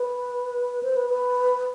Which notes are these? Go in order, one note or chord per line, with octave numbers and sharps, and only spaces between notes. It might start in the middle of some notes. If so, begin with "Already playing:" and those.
Already playing: B4
C5
B4
B4